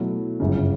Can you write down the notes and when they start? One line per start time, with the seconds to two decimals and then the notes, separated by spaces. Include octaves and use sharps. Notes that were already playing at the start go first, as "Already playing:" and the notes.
Already playing: B2 F#3 A3 E4
0.40 G1 F#2 C#3